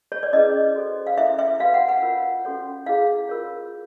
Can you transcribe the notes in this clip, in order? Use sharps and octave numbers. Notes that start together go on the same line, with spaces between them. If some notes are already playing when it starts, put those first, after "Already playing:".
C#5
D5
C#4 E4 G#4 B4 D#5
F#4 A4 C5
F5
C#4 E4 A4 E5
E5
F#4 B4 F5
F#5
F#5
F4 A#4 C#5
C#4 F#4 A4 C#5
E4 G#4 C#5 F5
F4 A#4 C#5